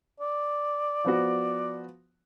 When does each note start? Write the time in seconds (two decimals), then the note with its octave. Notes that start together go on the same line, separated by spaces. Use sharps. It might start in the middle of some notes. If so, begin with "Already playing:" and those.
0.20 D5
1.04 F3 B3 F#4